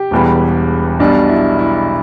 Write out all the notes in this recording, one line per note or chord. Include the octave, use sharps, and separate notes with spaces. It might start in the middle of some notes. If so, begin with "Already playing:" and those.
Already playing: G4
E1 E2 E3 G3
B1 B2 G3 D4
E4
E4